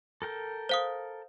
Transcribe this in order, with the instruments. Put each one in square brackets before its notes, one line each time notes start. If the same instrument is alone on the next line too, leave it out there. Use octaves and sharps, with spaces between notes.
[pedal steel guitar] A4 A#4 G5
[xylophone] C5 F5 D#6